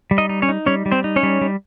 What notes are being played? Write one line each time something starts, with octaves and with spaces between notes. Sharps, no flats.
G3
D#4 D#5
D#4
C#4 C#5
D#4
G3 C#4 C#5
G3
C4 C5
D#4
C#4 C#5
G3
G3